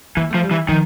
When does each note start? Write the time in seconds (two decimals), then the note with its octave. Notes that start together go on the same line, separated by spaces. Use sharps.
0.17 E3 A#3
0.30 F3 A3
0.43 G3
0.51 E3
0.68 D#3 F3